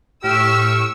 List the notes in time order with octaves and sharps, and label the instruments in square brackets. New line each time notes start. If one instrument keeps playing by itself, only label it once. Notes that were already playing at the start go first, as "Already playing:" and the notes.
[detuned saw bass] A2 [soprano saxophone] G4 [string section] C#6 E6 [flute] F6